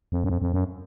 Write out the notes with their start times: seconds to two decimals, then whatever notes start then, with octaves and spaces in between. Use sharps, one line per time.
0.12 F2
0.24 F#2
0.29 F2
0.42 F2
0.53 F#2